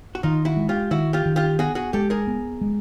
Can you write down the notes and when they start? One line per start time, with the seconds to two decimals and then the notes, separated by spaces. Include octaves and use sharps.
0.15 F#4
0.23 D#3 D#4 F4
0.45 E4 F#4
0.57 G#3
0.69 F4 G4
0.91 D#3 E4 F#4
1.13 F4 G4
1.26 D#3
1.36 F4 G4
1.59 B3 F#4 G#4
1.75 F#4 G#4
1.93 G#3 G4 A4
2.10 G#4 A#4
2.27 B3
2.61 G#3